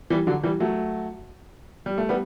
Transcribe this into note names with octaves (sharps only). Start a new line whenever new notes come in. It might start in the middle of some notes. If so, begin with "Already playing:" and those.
E3 G3
D3 F#3
E3 G3
F#3 A3
G3
A3
G3 B3